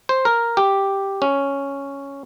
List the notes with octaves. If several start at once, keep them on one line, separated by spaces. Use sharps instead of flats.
C5
A#4
G4
C#4